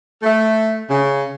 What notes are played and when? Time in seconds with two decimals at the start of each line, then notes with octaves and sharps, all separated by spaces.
0.23 A3
0.89 C#3